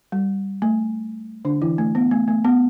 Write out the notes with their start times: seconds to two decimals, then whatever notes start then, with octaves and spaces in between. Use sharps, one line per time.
0.12 G3
0.62 A3
1.45 D3 D4
1.62 E3 E4
1.78 A3
1.95 B3
2.11 A3
2.28 A3
2.45 B3